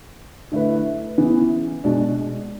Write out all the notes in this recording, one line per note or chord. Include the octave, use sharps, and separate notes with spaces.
D3 A3 E4 B4
C#3 E3 B3
B2 G#3 D4 G#4